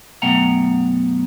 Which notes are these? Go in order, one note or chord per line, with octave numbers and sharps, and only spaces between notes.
F#2 B2 A3 F#5 G5 A#5